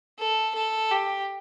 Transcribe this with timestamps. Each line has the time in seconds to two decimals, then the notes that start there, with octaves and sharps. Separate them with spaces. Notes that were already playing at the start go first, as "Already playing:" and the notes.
0.19 A4
0.55 A4
0.91 G4